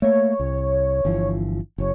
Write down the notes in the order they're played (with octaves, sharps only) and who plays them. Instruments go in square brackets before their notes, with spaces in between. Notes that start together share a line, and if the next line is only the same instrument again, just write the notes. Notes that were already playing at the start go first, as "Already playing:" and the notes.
[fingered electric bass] A3 A#3 [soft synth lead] C#5
[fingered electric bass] C2
G1 E3 F3
[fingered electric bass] F#1 F#2 [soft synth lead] C#5